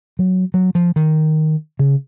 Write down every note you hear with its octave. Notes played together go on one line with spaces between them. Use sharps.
F#3
F#3
F3
D#3
C#3